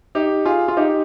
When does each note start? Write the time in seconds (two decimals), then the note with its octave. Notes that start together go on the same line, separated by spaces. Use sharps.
0.15 D#4 G4
0.46 F4 G#4
0.68 F4
0.77 D#4 G4